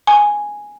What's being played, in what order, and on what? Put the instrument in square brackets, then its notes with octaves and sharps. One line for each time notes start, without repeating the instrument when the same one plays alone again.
[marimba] G#5